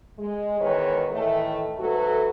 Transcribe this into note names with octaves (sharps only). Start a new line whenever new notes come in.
G#3
E2 D#3 G#3 B4 C#5
A2 D#3 E3 A3
G#2 F#3 A3 F#4 A4 B4